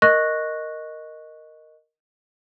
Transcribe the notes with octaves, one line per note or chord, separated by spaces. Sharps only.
A#4 D#5 C#6 F#6 A#6